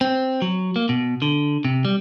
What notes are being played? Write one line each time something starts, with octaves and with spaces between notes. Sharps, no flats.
C4
F#3
A#3
B2
D3
C3
G3